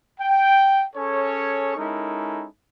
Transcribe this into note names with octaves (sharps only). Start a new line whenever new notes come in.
G5
C#4 G#4 A4 C#5
G#3 C#4 D#4 E4 A4 A#4